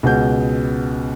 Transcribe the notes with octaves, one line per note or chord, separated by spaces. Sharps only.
C#2 B2 B3 G6